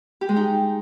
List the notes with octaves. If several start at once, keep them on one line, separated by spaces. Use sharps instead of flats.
G4
G#3
D#4